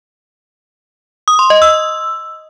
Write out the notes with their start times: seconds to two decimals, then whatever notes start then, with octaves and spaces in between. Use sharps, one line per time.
1.28 D#6
1.39 C6
1.50 D#5
1.62 E6